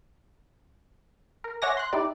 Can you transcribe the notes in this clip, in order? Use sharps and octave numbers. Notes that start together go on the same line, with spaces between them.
A#4
C#5 E5 F#5 G#5 D6 A#6
C6 F#6
D#4 E4 G4 D5